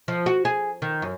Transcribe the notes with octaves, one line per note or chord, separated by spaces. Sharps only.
F3
F#4
G#4
D#3
F#2